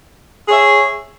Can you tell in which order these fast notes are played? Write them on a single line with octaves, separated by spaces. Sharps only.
G#4 C#5 E5